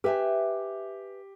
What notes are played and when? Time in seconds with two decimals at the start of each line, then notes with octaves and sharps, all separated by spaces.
0.04 G4 B4 E5 G#5